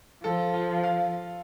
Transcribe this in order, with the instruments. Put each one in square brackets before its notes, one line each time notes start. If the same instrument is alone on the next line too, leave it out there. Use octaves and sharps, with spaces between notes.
[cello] F3 [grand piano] A4
[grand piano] F4
F5